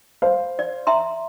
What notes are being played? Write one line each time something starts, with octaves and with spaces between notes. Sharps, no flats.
C5 F5
D5
E5 A#5 C6